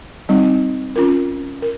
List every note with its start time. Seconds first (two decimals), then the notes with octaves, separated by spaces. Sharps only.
0.29 G3 C4 D#4
0.96 C#4 F4 A#4
1.62 A#4